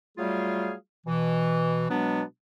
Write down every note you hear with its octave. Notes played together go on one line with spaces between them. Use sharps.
F#3 G3 A3 F4 G#4 F5
B2 E3
B2 F#3 G#3 B3 D4